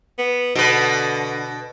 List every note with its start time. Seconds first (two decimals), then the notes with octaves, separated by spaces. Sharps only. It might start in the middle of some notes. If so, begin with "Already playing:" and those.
0.19 B3
0.55 B2 D3 B4